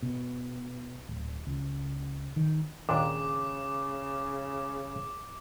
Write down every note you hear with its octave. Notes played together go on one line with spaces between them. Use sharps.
B2
D1
C#2
D#3
D#2 A#2 C#3 D4 D6